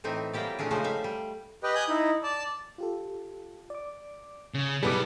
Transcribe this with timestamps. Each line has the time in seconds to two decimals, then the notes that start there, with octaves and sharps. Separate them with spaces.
0.04 A2 E3 C4 D#4 E5
0.33 F#3 G3 A#3 E4 G4 D5
0.59 A#2 A3 C#4 D4 G#4
0.71 C#3 F3 G#3 A3 D#4 C5
0.84 G3 E5 F5
1.04 G3
1.63 G4 B4 D#5 G5
1.75 G#5 D#6 F#6 G6
1.89 D#4 E4
2.23 D5 A5
2.78 F4 G4 A4
3.70 D5 D6
4.54 C#3
4.83 B1 G2 G3 B3 E4 G#4 A4 D6